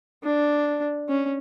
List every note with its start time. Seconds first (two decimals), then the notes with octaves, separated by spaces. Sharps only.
0.23 D4
1.08 C#4